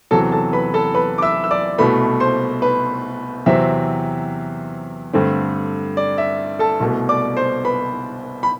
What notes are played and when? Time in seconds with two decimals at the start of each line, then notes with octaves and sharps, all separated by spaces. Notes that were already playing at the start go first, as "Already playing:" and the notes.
0.11 E2 C3 F#3 A4 A5
0.32 A4 A5
0.53 B4 B5
0.74 A4 A5
0.95 B4 B5
1.18 D6
1.22 E5 E6
1.44 E6
1.51 D5 D6
1.78 C2 B2 A3 B4 B5
2.20 C5 C6
2.62 B4 B5
3.46 E2 C3 F#3 C4 E5
5.13 G2 D3 A3 C4
5.97 D5
6.18 E5
6.59 A4 A5
6.80 C2 B2 A3
7.09 D5 D6
7.37 C5 C6
7.65 B4 B5
8.43 B5